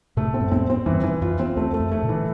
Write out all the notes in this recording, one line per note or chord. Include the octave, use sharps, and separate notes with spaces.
A2 C3 A3
C4
G2
F2 A2 C4
C4
E2 G2 E3
E3
F2 F4
C4
E2 A3
A3
F2
A3
A#2 D3
E3